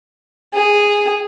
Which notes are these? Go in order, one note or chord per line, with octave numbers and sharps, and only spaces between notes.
G#4